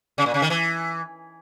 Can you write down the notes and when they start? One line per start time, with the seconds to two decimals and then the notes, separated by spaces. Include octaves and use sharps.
0.18 C#3
0.26 A#2
0.34 C#3
0.42 D#3
0.50 E3